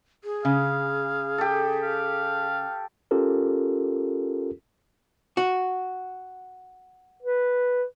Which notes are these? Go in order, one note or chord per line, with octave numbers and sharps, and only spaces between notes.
G#4
C#3 F5
G4 A4
F5
C#4 F4 G4 A4 A#4
F#4
B4